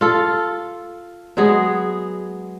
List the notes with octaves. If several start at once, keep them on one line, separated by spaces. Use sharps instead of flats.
F4 A4
F#3 G#3 B3 G#4